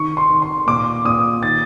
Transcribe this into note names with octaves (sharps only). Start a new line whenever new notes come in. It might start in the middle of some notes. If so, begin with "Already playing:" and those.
Already playing: D#3 C#6
C6
D#3
C6
A#2 D6
A#2 D#6
D#3 A6